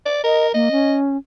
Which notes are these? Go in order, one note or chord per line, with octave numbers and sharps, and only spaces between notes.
D5
A#4 D#5
A#3 D#5
C#4